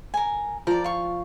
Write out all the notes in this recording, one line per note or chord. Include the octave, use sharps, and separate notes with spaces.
A#4 G#5
F3 A#4 D5
F5 C#6